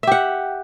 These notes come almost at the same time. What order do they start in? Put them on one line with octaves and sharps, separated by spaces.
E5 G4 F#5